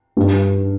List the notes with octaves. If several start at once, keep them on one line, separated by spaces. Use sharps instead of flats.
G2